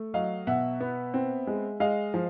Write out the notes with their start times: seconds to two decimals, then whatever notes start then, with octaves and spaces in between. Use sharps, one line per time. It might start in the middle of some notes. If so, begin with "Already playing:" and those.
Already playing: A3
0.14 F#3 D#5 F5
0.47 B2 E5 F#5
0.80 B3
1.14 C4
1.47 G#3
1.80 G#3 D#5 F5
2.14 F3